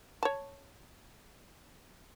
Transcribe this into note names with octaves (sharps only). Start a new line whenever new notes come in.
C#5 A5